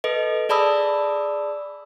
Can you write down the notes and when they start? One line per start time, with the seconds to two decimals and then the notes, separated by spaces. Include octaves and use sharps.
0.04 A4 B4 D#5
0.49 G#4 D5 A5 B5 D#6 E6